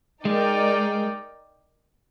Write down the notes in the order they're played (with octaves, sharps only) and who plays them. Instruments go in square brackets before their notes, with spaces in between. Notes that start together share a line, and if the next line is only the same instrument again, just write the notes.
[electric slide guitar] G#3 [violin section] D#4 A#4 D5 G5